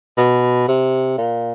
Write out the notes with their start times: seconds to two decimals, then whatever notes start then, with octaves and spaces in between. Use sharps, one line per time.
0.17 B2
0.67 C3
1.18 A#2